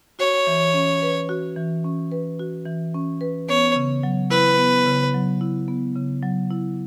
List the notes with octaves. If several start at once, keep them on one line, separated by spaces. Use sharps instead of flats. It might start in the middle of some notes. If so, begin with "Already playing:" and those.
F#4 C#5
E3
C#4
B4
F#4
E3
C#4
B4
F#4
E3
C#4
B4
B3 C#5
C#3
F#3
E4 B4
B3
C#3
F#3
E4
B3
C#3
F#3
E4